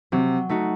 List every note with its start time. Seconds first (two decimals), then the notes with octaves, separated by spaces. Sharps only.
0.12 C3 F#3
0.49 A3 D#4 F#4